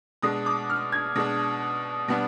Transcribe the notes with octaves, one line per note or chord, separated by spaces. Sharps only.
B2 G#3 D4 D#6
D6
F6
G#6
B2 G#3 D4
B2 G3 B3 D4